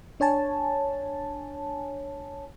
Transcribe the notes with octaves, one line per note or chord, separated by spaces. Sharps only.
D4 C#5 G#5 A5